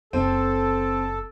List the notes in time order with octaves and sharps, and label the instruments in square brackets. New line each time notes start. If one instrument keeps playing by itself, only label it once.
[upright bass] F#1 [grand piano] C4 [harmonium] A4